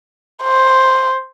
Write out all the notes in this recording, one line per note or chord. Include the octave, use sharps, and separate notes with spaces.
C5